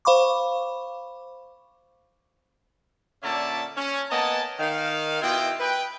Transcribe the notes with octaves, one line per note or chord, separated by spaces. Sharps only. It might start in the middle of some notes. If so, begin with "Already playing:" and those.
C5 F5 B5 C#6 D6
A#2 D3 C#4 D5 E5 A5
C#4
A#3 B3 D#5 G#5 A5
D#3 F5
B2 E4 F4 D#5 G5
B4 G5